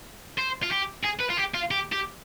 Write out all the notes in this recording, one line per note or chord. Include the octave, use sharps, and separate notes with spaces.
C5
F4
G4
G#4
B4
F4
G4
F4
G4
G4